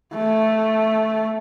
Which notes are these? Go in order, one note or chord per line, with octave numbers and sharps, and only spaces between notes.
A3